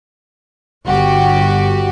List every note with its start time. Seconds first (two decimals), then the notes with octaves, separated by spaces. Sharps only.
0.86 G1 F#4 G4